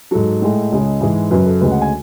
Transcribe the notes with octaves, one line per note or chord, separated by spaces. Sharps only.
G#2 F#3 A4
A2 G#3
C#2 C#3 G#3
G#2 E3 G#3
F#2 C#3 F#3 B4
A4
D2 C#3 G#3 B4
F#5
G#5